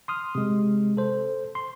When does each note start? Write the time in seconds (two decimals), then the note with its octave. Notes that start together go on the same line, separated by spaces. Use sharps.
0.08 C6 D#6 F6
0.35 C3 G#3
0.97 A4 C5
1.55 C6